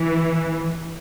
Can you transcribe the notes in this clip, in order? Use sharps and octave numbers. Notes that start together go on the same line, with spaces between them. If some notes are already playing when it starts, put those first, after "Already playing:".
Already playing: E3